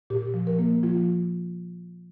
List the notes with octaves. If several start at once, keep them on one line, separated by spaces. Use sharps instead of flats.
A#2 G4
F3
A#4
A#3
F3 F4